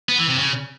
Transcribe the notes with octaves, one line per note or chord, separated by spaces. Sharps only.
B3
E3
C3
C#3